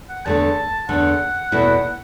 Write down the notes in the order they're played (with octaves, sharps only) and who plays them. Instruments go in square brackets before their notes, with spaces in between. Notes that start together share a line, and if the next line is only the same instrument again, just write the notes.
[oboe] F#5
[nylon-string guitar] E2 D3 A3 [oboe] A5
[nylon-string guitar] E2 D3 A3 [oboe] F#5
[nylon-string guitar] E2 B2 A3 E4